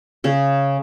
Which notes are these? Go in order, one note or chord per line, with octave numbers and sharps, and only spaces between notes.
C#3 C#4